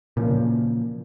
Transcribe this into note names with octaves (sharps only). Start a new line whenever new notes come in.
A#2 C#3 E3 F3